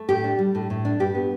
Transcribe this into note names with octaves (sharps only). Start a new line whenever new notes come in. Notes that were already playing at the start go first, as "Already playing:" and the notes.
Already playing: A3
A2 G4
D4
G3
A2
A2
D4
G2 G4
B3